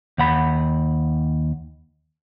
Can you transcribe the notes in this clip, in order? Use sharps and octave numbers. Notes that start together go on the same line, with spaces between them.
D#2 F#5 B5